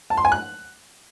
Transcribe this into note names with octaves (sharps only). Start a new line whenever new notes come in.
A5
C6
G#5
F#6